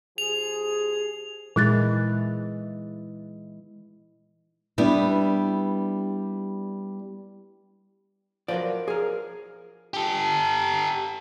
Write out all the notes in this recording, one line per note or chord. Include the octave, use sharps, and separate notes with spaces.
F3 G4 G#4 F7
A#2 E3 G#3 E4 F#6 A6
G3 B3 D4 E4
F3 F#3 A#4 B4 D5
G#4 A#4
G4 A4